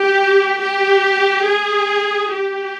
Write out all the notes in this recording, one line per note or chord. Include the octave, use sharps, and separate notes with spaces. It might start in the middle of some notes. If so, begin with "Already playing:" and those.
Already playing: G4
G4
G#4
G4